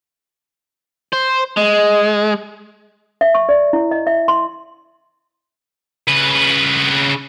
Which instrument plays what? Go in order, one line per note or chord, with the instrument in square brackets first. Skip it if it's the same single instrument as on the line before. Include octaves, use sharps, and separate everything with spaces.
[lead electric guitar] C5
G#3
[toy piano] E5
C#6
D5
E4
D#5
E5
C6
[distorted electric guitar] C#3 B4